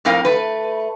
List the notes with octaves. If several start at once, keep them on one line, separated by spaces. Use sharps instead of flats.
F2 A2 C4 A#4 F5
A3 B4